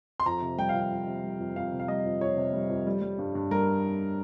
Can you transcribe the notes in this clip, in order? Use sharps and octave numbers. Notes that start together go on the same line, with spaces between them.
C6
F2 A#5
C3
G3 G5
F5
F2
G5
F2
C3
G3
F2
F2 F5
C3
F5
G3 D#5
F2
F2 C#5
C3
G3
F2
G3
G3
G2
G2
G3 A#4